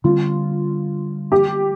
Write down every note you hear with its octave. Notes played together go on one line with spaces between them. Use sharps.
D3 G3 C4 F4
G4